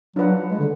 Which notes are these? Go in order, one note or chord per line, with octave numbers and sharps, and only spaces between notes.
F#3 D4 F4 B4 F#5
G#3
D3